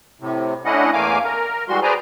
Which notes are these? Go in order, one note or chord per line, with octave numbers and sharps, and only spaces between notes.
A2 C3
A3 C#4 D4 E4 D#5 F#5
E2 A3 A#3 F5 G#5 D6
A#4
E3 G3 G#3 F#4 C6
G#4 B4 C5 D5 G#5 A#5